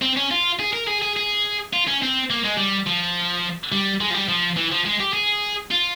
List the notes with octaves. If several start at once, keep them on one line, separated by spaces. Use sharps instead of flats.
C4
C#4
F4
G#4
A#4
G#4
G#4
G#4
F4
C#4
C4
A#3
G#3
G3
F3
G3
G#3
F3
G3
F3
E3
F3
G#3
G4
G#4
F4